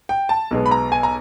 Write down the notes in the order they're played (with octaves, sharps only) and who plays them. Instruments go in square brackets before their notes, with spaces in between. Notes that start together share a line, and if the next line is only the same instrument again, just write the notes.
[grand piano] G5
A5
B1 B2 G#3 B3
B5
A#5
G#5
A#5